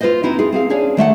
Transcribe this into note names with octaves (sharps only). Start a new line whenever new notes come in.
F4 F#4 B4 C5 D#5
C4 D#4 E4 F#4
F4 G#4
C4 G#4 F5
C#4 D4 G#4 C#5 D5
D#3 A3 E5 F#5